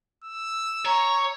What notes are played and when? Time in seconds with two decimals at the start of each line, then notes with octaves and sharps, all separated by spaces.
0.24 E6
0.85 C#5 A#5